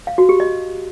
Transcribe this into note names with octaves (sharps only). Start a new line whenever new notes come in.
F5
F#4
G4
D#5